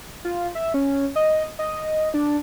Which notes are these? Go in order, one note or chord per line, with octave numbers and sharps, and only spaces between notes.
F4
E5
C#4
D#5
D#5
D4